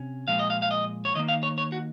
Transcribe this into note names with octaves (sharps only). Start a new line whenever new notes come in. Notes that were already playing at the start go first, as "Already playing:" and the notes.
Already playing: C3 C#4
A#2 F3 G#3 F5
D#5
F5
F5
D#5
C#5
D#2 D#3 A#3 D#5
F5
C#5
C#5
F#4